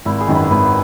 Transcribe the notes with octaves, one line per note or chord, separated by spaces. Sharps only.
G#1 E4
G#4
F#2 D#3
B4
G#1 B4